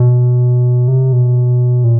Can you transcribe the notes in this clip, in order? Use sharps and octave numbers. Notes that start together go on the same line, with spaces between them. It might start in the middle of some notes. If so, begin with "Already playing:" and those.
Already playing: B2
C3
B2
A#2